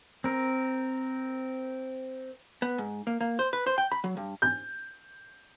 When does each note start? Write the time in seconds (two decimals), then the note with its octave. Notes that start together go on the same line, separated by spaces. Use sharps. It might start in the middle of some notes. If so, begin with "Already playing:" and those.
0.24 C4 A#4
2.62 B3
2.78 G#2
3.07 A#3
3.21 A#3
3.39 C5
3.53 B4
3.67 C5
3.78 G5
3.92 B5
4.04 F#3
4.17 G2
4.42 G6